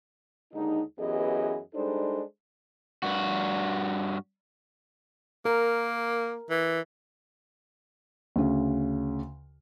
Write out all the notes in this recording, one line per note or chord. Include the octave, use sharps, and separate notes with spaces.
D#2 D3 G#3 D#4
F#2 E3 B3 G4 G#4 D#5
G3 G#3 D4 D#4 A4 C5
G2 F#4
A#3 A#4
E3
D2 C#3